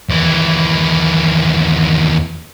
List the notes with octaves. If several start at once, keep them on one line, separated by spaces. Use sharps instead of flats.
D#2 E3